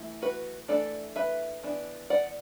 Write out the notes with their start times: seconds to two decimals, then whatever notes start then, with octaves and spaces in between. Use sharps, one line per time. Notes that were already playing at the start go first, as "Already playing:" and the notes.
Already playing: E3 A3 E4
0.22 F#4 B4
0.68 E3 A3 D4 A4 D5
1.16 B4 E5
1.63 E3 B3 D4
2.10 D5 F#5